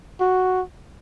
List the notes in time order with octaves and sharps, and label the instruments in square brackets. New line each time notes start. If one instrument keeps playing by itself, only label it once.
[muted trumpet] F#4